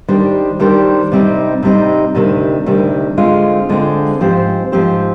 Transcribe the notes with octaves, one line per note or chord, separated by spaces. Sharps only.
D#3 G3 D4 G4 C5
D#3 G3 D4 G4 C5
C3 G3 C4 D#4
C3 G3 C4 D#4
D2 C3 D#3 G3
D2 C3 D#3 G3
D3 G#3 C4 F4
D3 G#3 C4 F4
G#2 F3 C4 G4 C5
G#2 F3 C4 G4 C5